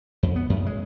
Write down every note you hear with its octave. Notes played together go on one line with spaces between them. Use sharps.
F2
B3
F#2
G#3